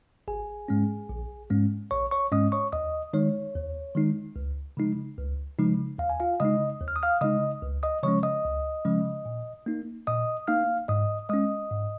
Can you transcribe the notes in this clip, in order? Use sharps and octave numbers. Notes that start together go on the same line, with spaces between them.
G#1 G#4 G#5
G#2 G#3 C#4
A#1
G#2 G#3 C#4
A#1 C#5 C#6
C#5 C#6
G#2 G#3 C#4 D#5 D#6
C#5 C#6
D#2 D#5 D#6
D#3 G#3 D#4 C#5
D#2
D#3 G#3 D#4
C#2
C#3 F3 G#3 D#4
C#2
C#3 F3 G#3 D#4
D#2 F5
G#5
F4 F5
C#3 G#3 D#4 D#5 D#6
D#2
F6
D#6
F5 F6
C#3 G#3 D#4 D#5 D#6
C#2
D#5 D#6
C#3 F3 G#3 C#4 C#5 C#6
D#5 D#6
C#2
C#3 F3 G#3 C#4
A#2
A#3 D#4
A#2 D#5 D#6
A#3 D#4 F5 F6
G#2 D#5 D#6
G#3 C#4 D#5 D#6
G#2